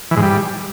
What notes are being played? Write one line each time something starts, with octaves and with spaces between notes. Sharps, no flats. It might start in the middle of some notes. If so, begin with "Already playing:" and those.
E3
G#2
G3